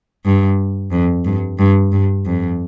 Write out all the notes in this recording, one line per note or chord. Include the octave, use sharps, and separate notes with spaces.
G2
F2
G2
G2
G2
F2